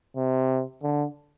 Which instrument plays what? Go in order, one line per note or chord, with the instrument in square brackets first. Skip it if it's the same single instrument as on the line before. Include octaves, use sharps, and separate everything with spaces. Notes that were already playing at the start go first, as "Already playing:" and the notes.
[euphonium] C3
D3